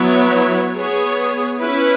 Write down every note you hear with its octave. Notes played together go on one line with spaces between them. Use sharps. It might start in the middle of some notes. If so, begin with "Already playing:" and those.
Already playing: F#3 B3 E4 C#5
B3 G#4 C#5
C#4 E4 B4